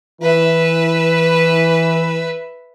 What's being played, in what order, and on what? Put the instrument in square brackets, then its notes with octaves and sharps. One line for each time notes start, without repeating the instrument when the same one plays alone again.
[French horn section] E3 E4 [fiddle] B4 E5